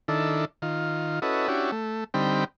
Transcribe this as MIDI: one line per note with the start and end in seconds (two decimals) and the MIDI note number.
0.08 0.45 51
0.08 0.45 62
0.08 0.45 64
0.08 0.45 69
0.62 1.19 51
0.62 1.19 65
1.22 1.48 61
1.22 1.48 64
1.22 1.48 66
1.22 1.48 69
1.22 1.48 71
1.22 1.48 75
1.48 1.71 61
1.48 1.71 62
1.48 1.71 64
1.48 1.71 66
1.48 1.71 67
1.72 2.04 57
2.14 2.44 50
2.14 2.44 55
2.14 2.44 60
2.14 2.44 63
2.14 2.44 79
2.14 2.44 83